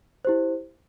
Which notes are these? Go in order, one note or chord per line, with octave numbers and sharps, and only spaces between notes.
E4 G4 C5